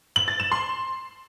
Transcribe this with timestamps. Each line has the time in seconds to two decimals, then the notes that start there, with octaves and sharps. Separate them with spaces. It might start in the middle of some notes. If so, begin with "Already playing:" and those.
0.16 F#7
0.28 A6
0.40 E7
0.52 C6